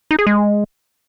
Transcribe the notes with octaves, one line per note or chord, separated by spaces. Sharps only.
D#4
G#4
G#3